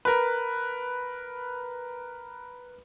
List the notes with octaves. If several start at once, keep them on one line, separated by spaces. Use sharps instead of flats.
A#4 B4